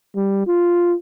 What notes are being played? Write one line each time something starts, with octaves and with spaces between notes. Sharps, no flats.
G3
F4